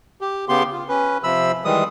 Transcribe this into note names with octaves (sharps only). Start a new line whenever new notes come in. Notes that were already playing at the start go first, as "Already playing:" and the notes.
G4
C#3 B3 G4 C6
F4
C#4 B4
C3 F3 B5 E6
D#3 E3 G3 G#3 D#6